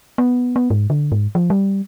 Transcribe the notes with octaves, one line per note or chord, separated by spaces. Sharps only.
B3
B3
G#2
D3
G#2
F3
G3